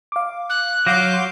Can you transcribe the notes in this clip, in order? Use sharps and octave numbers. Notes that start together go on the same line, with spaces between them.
F5 D6
F#6
F#3 F5 D6 G6 A#6
C6